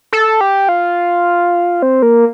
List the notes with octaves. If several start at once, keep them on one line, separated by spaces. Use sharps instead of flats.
A4
G4
F4
C4
A#3